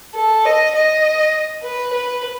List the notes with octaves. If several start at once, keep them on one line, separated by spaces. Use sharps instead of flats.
A4
D#5
D#5
B4
B4